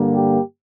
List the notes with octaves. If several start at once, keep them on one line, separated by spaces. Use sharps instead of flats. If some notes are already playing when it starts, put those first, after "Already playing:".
Already playing: G2 D3 G3 A#3
G4